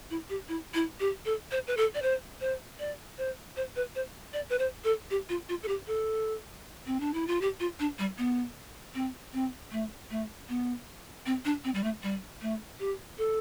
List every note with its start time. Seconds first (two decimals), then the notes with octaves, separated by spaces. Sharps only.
0.10 E4
0.30 G4
0.49 E4
0.74 E4
1.00 G4
1.25 A4
1.51 C5
1.67 B4
1.77 A4
1.95 D5
2.02 C5
2.41 C5
2.79 D5
3.18 C5
3.57 C5
3.76 B4
3.95 C5
4.33 D5
4.50 B4
4.59 C5
4.84 A4
5.10 G4
5.29 F4
5.49 F4
5.63 A4
5.68 G4
5.87 A4
6.86 C4
7.00 D4
7.14 E4
7.27 F4
7.41 G4
7.60 F4
7.80 D4
7.99 G3
8.18 B3
8.95 C4
9.33 C4
9.72 A3
10.11 A3
10.49 B3
11.26 C4
11.45 D4
11.64 C4
11.75 G3
11.84 A3
12.03 G3
12.42 A3
12.80 G4
13.18 A4